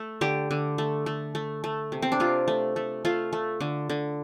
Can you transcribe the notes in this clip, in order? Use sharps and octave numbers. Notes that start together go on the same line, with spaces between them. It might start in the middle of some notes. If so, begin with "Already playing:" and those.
Already playing: A3 A4
D3 G4
D3
A3
A3
A3
A3
C3
C4
D4
C3 F4
A3
A3
A3 F4
A3
D3
D3